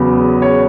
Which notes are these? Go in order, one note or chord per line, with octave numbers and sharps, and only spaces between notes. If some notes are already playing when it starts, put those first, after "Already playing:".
Already playing: E2 C#3 F#3 B3
C#5